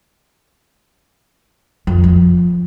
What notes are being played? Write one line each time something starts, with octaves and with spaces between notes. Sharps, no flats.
F2
F3